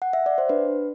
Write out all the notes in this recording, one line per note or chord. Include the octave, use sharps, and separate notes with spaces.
F#5
E5
D5
C5
D4 B4